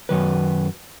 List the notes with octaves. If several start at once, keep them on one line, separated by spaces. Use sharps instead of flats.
F#2 D#3 B4